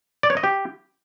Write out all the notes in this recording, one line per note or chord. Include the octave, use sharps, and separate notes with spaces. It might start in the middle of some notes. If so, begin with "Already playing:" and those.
D5
C#5
D#5
G4